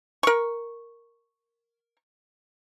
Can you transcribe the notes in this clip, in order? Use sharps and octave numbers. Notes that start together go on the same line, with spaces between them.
A#4 C#6